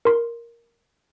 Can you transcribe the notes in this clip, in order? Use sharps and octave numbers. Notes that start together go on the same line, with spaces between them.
A#4 C6